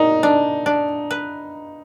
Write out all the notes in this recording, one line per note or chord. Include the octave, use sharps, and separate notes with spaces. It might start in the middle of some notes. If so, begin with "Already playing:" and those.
Already playing: A#2 D#4
D4
D4
B4